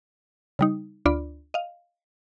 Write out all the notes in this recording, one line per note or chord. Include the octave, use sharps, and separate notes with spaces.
C#3 G3 D#4
D2 D4 F4 D5 B5
D#5 F5